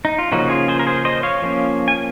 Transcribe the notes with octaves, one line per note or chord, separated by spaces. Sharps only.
D#4
F4
C#3 F3 A#3 C#4 D#4 F#4
F4 G#4
G#4 C5
A#4
G#4 C5
C5 D#5
C#5 F5
F3 A#3 C#4
G#5